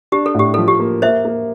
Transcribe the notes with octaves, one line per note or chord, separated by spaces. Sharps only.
D4 G4
A4
A2 G4
F3 A4
G4
A#3
A#3 C5 E5
A#3